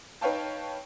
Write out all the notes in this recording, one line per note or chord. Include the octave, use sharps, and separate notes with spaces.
D#4 B4 C#5 F5 G5 A5